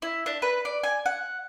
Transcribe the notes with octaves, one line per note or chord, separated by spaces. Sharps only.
E4
D4
B4
D5
G#5
F#5